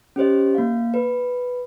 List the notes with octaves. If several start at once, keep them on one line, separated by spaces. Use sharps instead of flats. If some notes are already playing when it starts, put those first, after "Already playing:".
C#4 G4 C5 D#5
A#3 F5
B4